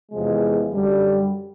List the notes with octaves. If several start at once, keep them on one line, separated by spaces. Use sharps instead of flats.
E2 C3 F3 G#3
F#2 D3 G3